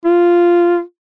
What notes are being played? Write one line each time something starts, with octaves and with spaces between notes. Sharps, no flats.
F4